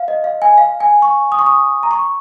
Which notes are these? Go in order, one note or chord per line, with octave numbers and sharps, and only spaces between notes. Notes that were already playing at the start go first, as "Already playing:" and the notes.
Already playing: F5
D#5
F5
G#5
F5
G#5
C#6
D#6
C#6
D#6
A#5
C#6